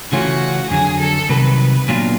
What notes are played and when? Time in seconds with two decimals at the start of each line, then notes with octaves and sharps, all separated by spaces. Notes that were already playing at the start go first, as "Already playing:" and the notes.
0.12 C#3 E3 A3 C#4 F4 F#4
0.70 F2 D3 F#3 G#4
1.00 A4
1.29 C2 C3 D#3 F#3 B4
1.88 A#2 F#3 B3 D4 F4